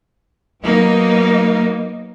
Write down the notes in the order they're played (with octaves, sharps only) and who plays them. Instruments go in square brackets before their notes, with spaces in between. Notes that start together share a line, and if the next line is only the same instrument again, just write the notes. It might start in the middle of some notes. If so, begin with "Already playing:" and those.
[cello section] F#3 A#3 B3 D#4